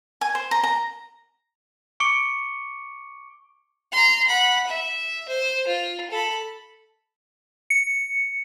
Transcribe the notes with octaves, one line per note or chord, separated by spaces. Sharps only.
G#5
C5
A#5
A#5
C#6 D6 C#7 D7 G7
A#5 C6
F#5 B5
E5
C5
F4
A4 B5
C#7